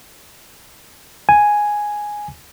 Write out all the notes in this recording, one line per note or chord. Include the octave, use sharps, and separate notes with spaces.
G#5